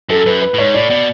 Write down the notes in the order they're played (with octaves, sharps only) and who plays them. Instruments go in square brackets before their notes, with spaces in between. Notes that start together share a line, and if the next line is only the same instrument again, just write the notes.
[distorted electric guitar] F#2 [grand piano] A4
[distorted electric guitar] F#2 [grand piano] B4
[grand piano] B4
[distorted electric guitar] A2
[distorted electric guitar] G#2 [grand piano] C#5
[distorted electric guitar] A2 [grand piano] D5
[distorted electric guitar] B2 [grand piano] D5